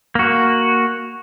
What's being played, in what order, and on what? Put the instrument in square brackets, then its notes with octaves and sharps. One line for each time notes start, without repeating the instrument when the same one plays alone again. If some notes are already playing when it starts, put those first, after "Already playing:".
[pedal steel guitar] A#3 F#4